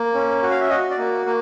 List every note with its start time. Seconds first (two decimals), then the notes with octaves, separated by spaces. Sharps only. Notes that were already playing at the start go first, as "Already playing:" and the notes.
Already playing: A#3
0.14 C#4
0.43 F#4
0.51 F5
0.61 E5
0.70 F#4 D#5
0.91 D5
0.98 A#3
1.26 A#3